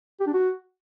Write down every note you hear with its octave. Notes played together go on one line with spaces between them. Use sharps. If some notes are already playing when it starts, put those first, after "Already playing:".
G4
D4
F#4